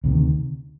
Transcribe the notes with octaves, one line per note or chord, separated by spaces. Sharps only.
D2 C3 D#3